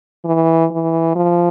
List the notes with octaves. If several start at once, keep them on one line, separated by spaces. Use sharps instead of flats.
E3
E3
F3